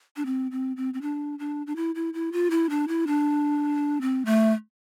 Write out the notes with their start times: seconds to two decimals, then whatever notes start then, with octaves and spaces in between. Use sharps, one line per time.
0.16 D4
0.26 C4
0.51 C4
0.77 C4
0.94 C4
1.02 D4
1.39 D4
1.67 D4
1.76 E4
1.95 E4
2.14 E4
2.32 F4
2.50 E4
2.70 D4
2.88 E4
3.07 D4
4.01 C4
4.25 A3